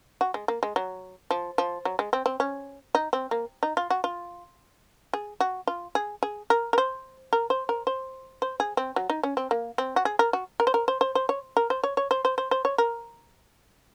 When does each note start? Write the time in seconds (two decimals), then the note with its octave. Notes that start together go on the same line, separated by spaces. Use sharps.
0.21 F#4
0.34 G#3
0.48 A#3
0.63 G#3
0.76 F#3
1.31 F3
1.58 F3
1.85 F#3
1.99 G#3
2.13 C4
2.26 C4
2.40 C#4
2.95 D#4
3.13 C4
3.31 A#3
3.63 D#4
3.77 F4
3.90 F#4
4.04 F4
5.13 G#4
5.40 F#4
5.67 F4
5.95 G#4
6.23 G#4
6.50 A#4
6.73 A#4
6.78 C5
7.33 A#4
7.50 C5
7.69 A#4
7.87 C5
8.42 C5
8.60 G#4
8.77 C4
8.96 F#3
9.10 D#4
9.23 C#4
9.37 C4
9.51 A#3
9.78 C4
9.96 F#4
10.05 G#4
10.19 A#4
10.33 F#4
10.60 A#4
10.67 C5
10.74 A#4
10.88 C5
11.01 C5
11.15 C5
11.29 C#5
11.57 A#4
11.70 C5
11.84 C#5
11.97 C#5
12.11 C5
12.25 C5
12.38 C5
12.51 C5
12.65 C#5
12.78 A#4